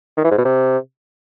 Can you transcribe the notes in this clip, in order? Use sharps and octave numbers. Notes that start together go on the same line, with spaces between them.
D#3
E3
G#2
B2
C3